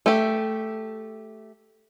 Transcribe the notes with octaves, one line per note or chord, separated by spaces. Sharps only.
A3 G4